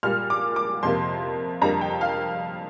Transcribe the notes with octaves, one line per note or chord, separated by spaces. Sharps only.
A#2 G3 A#3 F6
D6
D6
F2 C3 A#3 C6
F2 D3 G3 A#3 A#5
G5
F5